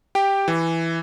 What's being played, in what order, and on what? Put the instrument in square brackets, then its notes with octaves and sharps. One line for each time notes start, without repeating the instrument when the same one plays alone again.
[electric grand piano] G4 G5
E3